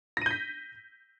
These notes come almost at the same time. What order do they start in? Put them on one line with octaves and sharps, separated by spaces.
A#6 D#7 G6 B6